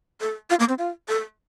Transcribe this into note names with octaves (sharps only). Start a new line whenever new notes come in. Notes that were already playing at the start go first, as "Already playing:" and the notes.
A4
F4
A#3
C4
F4
A4